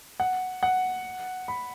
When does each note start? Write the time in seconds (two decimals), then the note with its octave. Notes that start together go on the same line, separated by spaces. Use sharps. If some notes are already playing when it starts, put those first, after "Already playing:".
0.20 F#5
0.63 F#5
1.48 B5